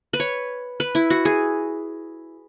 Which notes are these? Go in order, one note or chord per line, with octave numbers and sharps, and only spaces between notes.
B4
C#5
B4
E4
F#4
G#4